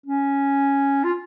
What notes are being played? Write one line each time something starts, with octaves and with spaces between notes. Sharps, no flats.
C#4
F4